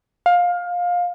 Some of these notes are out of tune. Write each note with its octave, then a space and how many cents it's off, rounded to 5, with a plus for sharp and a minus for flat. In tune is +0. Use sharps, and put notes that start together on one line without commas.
F5 +20